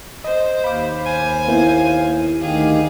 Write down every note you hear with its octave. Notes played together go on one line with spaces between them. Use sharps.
C5 D#5
D#2 F5 B5 D6
C5 G#5
A#3 B3 E4
D2 D#3 G4 G#4 F5